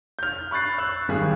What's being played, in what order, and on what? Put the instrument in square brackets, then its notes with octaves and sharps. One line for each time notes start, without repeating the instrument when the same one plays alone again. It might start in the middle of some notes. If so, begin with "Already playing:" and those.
[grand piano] F6 G6
B5 C#6 F#6 A6 C7
C#6 E6 F#6
G#1 D#2 G3 G4 G#4 F#6